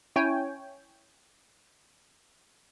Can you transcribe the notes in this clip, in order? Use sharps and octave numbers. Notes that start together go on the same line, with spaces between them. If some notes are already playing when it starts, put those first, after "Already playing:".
C#4 E4 C#5 G5 G#5